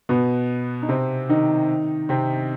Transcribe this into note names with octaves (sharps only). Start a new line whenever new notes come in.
B2 B3
D#4
C3 C4
D#3 D#4
C3 C4